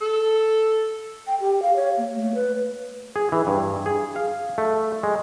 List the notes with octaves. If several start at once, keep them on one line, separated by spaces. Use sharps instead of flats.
A4
G5
G4
F5
C#5
A#3
A3
B4
G#4
E3
G2
G#4
F5
A3
G#3